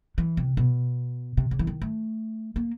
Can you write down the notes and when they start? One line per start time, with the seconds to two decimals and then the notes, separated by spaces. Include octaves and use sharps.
0.18 E3
0.37 C3
0.57 B2
1.37 C3
1.51 C#3
1.59 E3
1.67 D#3
1.82 A3
2.56 A#3